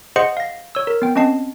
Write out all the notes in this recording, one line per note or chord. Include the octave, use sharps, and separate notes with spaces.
G#4 C5 D#5 F#5 C6 C#7
F5 A#6
C#5 E6
A#4
B3 G5
C4 C#4 D#5 A5 C7